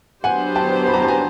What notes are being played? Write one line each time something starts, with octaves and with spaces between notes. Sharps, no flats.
F#3 B3 D4 G4 C5 F#5 G#5
G5 A5
B5
A#5
A5
G#5 A#5